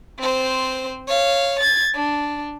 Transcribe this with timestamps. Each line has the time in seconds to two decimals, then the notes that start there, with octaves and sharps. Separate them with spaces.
0.19 C4 C5
1.07 C#5 F5
1.60 G#6 A6
1.95 D4